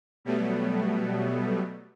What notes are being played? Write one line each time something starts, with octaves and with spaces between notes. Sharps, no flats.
B2 F#3 G3 A3 B3